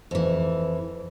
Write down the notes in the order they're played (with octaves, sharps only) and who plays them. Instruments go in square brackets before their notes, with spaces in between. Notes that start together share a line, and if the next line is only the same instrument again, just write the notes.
[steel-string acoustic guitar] F2 E3